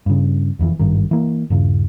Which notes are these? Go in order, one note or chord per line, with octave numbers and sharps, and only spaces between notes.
G2 C#3
E1 F2 A2 E3
G#1 G2 D#3
E3 A#3
D#1 G2 C#3